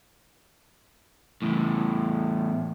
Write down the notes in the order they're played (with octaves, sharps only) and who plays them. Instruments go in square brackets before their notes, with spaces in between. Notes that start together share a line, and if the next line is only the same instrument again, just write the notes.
[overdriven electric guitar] E2 A2